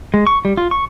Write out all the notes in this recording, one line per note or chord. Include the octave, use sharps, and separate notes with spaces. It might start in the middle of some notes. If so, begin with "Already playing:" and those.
G#3
C#6
G3
F4
C#6